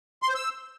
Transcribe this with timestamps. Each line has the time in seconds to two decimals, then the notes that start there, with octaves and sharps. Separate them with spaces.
0.22 C6
0.29 C5
0.35 E6